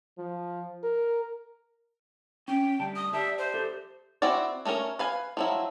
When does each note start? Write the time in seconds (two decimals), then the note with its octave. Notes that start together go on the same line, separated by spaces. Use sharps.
0.18 F3
0.83 A#4
2.48 C#4 G5
2.80 D2 G3 A5
2.96 D#6
3.13 G4 D5 E5 A5
3.38 C5
3.54 G4 A4 E5
4.22 C4 E4 F#4 D5
4.65 A3 C#4 A4 A#4 C#5
4.99 B4 F5 G#5
5.37 F3 F#3 E4